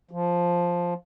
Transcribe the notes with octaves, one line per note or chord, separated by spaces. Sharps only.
F3